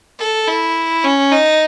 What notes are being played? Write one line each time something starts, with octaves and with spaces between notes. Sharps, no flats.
A4
E4
C#4
D#4